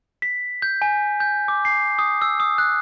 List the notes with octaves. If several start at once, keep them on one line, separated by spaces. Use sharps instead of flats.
B6
G6
G#5
G6
D6
C7
D#6
E6
D#6
F#6